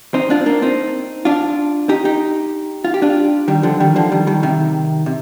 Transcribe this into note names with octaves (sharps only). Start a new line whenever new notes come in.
C4 D#4
D4 F4
C4
A#3 D4
C4 D#4
D4 F4
D#4 G4
D#4 G4
F4
G4
D4 F4
D#3 G3
D3 F3
D#3 G3
D3 F3
D#3 G3
D#3 G3
C3 D#3
C3